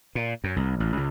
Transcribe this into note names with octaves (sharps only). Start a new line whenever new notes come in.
A#2
F#2
C2
A1
C#2